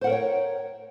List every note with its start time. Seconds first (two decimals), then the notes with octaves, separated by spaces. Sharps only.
0.01 C5
0.04 F#5
0.07 A#4
0.10 C#5
0.12 G5